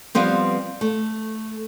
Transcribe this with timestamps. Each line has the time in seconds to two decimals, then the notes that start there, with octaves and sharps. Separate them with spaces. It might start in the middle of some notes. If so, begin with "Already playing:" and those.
0.15 F3 G3 B3 C4
0.81 A3